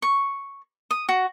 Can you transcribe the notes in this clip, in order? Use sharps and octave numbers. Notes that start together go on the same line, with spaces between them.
C#6
D#6
F#4